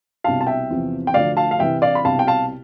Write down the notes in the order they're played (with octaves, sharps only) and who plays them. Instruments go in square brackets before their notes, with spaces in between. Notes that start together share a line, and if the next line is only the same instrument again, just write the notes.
[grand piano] C2 B2 F5 A5
A5
E5 G5
E2 C3 F3
G5
D2 D3 F3 D5 F5
F5 A5
F5
C2 C3 E3 E5 G5
D5 F5
B5
C2 B2 F5 A5
G5
F5 A5